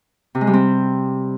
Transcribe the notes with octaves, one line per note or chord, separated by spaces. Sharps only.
C3
G#3
G3
C4